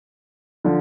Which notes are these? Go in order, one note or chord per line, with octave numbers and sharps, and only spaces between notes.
D3 F3